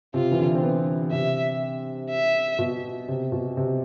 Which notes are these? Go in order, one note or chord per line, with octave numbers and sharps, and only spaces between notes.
C3 F4
E3
D3
C4
B3
C3 E5
E5
B2
C3
B2
C3